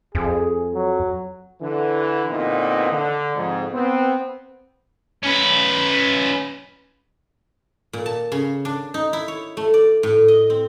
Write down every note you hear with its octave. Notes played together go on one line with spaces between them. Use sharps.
F2 G#4
F#3
D3 E3
A#2 D3 E3 B3 C4 D#4
D3
F2 G#2
B3 C4
C#4 B4
A#2
A5
C#3
D4
D#4
E4
C#5
A3
D5
A2
D#5
C4